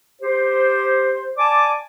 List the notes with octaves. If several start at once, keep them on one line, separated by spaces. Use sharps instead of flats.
G4 C5
D5 G#5 A5 D6